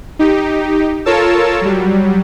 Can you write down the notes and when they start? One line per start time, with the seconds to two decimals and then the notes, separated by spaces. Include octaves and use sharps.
0.19 D#4 G4
1.06 F4 A4 A#4 C#5 A5 E6
1.61 F#3 G3